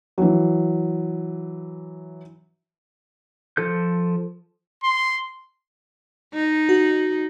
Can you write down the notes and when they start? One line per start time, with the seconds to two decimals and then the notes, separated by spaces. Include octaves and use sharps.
0.18 E3 F#3
3.57 F3 A4 G6
4.84 C6
6.34 D#4
6.69 F#4